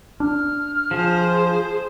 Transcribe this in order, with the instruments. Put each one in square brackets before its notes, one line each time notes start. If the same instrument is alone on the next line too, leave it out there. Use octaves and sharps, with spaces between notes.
[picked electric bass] D4 [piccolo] F6
[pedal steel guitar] F3 [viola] G#4 C5